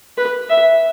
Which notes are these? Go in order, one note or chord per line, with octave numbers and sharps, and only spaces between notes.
B4
E5